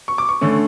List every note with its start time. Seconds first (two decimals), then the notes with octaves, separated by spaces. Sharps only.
0.08 C#6
0.18 D6
0.29 C#6
0.41 D3 A3 C#4